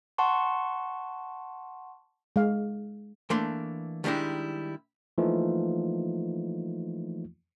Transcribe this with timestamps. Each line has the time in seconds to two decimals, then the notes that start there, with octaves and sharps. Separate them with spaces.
0.18 F#5 A5 C6 C#6
2.36 G#3 F5
3.30 E3 A3 A#3 D4 C6
4.04 D#3 G3 G#3 D4 E4
5.18 E3 F3 A3 A#3 D#4 F4